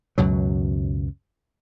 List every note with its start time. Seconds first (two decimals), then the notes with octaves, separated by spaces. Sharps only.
0.18 C#2 F#2 B2 F#3